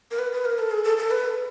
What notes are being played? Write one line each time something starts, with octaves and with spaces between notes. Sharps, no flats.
A#4
B4
B4
A#4
A4
G#4
A4
A4
B4